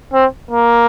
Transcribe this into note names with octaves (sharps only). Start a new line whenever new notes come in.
C4
A#3